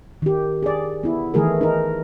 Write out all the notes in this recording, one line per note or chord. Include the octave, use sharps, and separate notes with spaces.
D#3 G4
G#4 D5
B3 E4
D#3 E3 A3 G#4 A#4
D#4 A#4